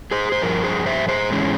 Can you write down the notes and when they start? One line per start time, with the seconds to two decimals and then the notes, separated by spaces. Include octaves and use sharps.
0.11 G#4 C5
0.32 C5
0.41 G2 F3 A#4
0.64 G#4 C5
0.86 C5 E5
1.09 G#4 C5
1.30 G#2 E3 G#3 C#4